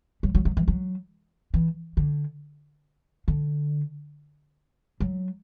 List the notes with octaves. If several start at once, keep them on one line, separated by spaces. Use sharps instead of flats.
F#3
F#3
F#3
E3
F#3
E3
D3
D3
F#3